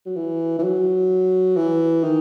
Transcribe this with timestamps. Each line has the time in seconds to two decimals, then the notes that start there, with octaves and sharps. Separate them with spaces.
0.06 F#3
0.16 E3
0.59 E3
0.63 F#3
1.57 E3
2.04 D#3